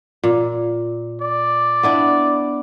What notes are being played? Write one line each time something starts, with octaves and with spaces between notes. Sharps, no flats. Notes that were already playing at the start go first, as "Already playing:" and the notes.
A#2
D5
B3 D4 E4